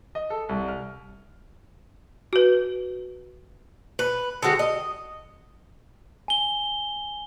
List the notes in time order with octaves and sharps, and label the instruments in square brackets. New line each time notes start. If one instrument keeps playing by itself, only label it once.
[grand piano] D#5
A4
C2
F6
[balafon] F#4 B4
[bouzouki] B4
D3 G#3 F#4 G4
D#5
[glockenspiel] G#5 G7